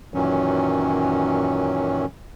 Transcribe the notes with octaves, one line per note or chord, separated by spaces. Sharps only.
F#2 A#2 D#3 E3 F#3 C#4